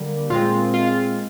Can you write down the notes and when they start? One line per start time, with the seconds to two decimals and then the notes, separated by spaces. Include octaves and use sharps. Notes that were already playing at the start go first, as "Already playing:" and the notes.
Already playing: D3 G3 A#3
0.30 A#2 G#3 C4 F4
0.74 F4